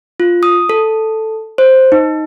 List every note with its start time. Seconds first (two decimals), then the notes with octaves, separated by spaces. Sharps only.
0.20 F4
0.43 D#6
0.69 A4
1.58 C5
1.92 D#4